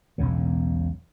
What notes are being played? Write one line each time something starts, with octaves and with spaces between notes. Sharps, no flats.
E1 B1 E2 C#3